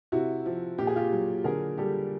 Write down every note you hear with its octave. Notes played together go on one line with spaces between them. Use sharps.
C3 E4 F#4
F3
A#2 G4
G#4
F4 G4
F#3
D3 G#4 A#4
G3 G4 A4